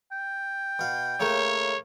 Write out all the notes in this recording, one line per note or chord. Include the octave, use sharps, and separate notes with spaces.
G5
B2 F5
C#3 A3 A#3 C#5